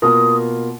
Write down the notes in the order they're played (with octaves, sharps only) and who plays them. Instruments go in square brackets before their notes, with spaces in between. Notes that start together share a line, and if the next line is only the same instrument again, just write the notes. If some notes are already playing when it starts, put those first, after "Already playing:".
[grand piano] B2 A#3 F4 A#4 [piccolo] D#6